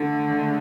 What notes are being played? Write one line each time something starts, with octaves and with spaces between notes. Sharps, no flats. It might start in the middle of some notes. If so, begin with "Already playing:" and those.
Already playing: D3 A3
G#3